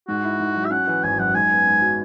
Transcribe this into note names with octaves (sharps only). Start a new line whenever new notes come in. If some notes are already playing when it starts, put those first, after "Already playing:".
G#2 F#4
E4
G#2
F#3
E5
C#4 F#5
E3
G#1 G#5
F#2 F#5
G#2 G#5
B3
G#2
F#3